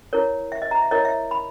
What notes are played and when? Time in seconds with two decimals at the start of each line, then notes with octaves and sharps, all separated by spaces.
0.13 E4 A#4 C#5
0.52 E5
0.62 D#5
0.71 A#5
0.82 E5
0.91 E4 A#4 C#5 D#5
1.05 E5
1.31 B5